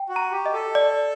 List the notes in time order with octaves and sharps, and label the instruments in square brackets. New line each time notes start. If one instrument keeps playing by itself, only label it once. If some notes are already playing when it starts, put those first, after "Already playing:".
Already playing: [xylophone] G5
[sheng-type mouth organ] F#4
[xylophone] A#5
[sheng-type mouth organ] G4
[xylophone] D#5
[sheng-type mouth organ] A4
[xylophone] D5